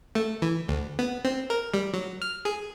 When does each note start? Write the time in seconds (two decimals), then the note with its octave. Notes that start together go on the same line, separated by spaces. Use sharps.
0.15 A3
0.42 E3
0.68 D2
0.99 B3
1.25 C4
1.50 A#4
1.74 G3
1.94 F#3
2.22 F6
2.45 G#4